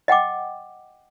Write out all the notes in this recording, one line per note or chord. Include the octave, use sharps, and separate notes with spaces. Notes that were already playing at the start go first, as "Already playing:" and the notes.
D#5 F#5 G5 D6